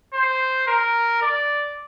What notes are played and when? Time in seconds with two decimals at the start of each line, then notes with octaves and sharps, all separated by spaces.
0.13 C5
0.67 A#4
1.22 D5